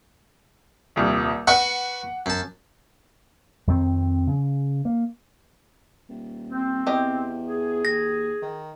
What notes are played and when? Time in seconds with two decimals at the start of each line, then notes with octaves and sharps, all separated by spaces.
0.96 D#1 C2
1.47 F#4 B4 F#5 C#6
2.26 F#2 A5
3.67 F2 D#3 C4
4.27 C#3
4.85 A#3
6.09 D#1
6.51 C4
6.87 E2 G4 D#5
7.46 G#4
7.85 D#2 A#6
8.42 D#3